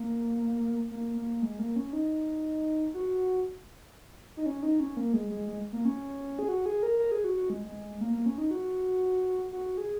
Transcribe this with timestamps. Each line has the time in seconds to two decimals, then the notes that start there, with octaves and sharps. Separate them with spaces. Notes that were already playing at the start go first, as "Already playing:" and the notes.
Already playing: A#3
0.91 A#3
1.17 A#3
1.42 G#3
1.59 A#3
1.76 C#4
1.93 D#4
2.94 F#4
4.37 D#4
4.46 C#4
4.63 D#4
4.80 C#4
4.97 A#3
5.13 G#3
5.30 G#3
5.48 G#3
5.73 A#3
5.85 C#4
6.39 G#4
6.48 F#4
6.66 G#4
6.83 A#4
6.99 A#4
7.12 G#4
7.24 F#4
7.37 F#4
7.50 G#3
7.64 G#3
8.00 A#3
8.13 A#3
8.26 C#4
8.38 D#4
8.51 F#4
9.53 F#4
9.78 G#4